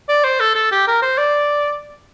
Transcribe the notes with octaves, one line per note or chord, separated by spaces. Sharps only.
D5
C5
A4
A4
G4
A#4
C5
D5